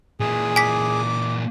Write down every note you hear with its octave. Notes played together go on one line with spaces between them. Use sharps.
A#2 E3 G#4
G#5 D6 B6